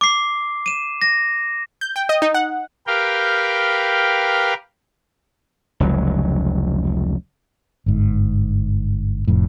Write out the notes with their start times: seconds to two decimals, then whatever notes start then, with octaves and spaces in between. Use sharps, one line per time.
0.01 D6 C7
0.66 D#7 E7
1.02 A#6
1.81 G6
1.96 G5
2.09 D#5
2.22 D#4
2.34 F#5
2.87 G4 A#4 B4 F5 G5
5.80 F1 C#2 F#3
7.86 G1 G#2
9.28 F1 F2 A2